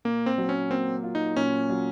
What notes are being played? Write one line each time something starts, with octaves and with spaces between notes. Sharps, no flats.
A#2 A#3
C4
F#3
C#4
A#3 C4
F4
D#4
A#2 C#4
F#3